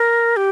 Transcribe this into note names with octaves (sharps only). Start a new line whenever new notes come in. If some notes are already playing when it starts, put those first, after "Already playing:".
Already playing: A#4
G4